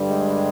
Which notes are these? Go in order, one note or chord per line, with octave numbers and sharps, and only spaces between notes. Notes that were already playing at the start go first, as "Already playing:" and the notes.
Already playing: G2 D3 G3
G#3